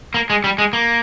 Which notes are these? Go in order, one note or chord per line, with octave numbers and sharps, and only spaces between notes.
A#3
G#3
G3
G#3
A#3